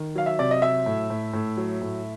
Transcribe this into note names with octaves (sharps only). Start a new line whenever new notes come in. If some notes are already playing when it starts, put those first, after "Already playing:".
Already playing: D#3
F#3 F5
E5
C3 D5
D#5
F#3 E5
A2
A2
A2
F#3
A2